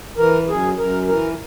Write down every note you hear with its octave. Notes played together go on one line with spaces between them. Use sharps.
E3 A#4
F#2 G#4
F#2 A#4
E3 A#4